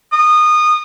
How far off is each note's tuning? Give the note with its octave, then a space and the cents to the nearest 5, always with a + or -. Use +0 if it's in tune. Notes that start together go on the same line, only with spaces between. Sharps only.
D#6 -25